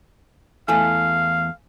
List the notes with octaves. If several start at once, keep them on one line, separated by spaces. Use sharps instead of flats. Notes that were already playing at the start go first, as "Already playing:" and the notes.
E2 A3 E4 F5 G#5